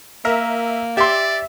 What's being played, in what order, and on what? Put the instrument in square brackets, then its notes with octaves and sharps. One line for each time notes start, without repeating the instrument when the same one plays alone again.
[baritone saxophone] A#3 [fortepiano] A#4 [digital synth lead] E5
[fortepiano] G4 C6 [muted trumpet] D5 [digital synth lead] E5